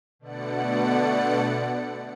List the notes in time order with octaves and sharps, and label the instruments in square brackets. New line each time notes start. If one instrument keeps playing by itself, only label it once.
[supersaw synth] B2 D3 A3 D5 F#5 C#7